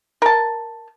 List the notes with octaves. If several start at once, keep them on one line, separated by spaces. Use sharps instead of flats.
A#4 A5